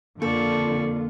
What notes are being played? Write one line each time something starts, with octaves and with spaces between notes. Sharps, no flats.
F2 D3 A#3 F4 A4 D5 C#6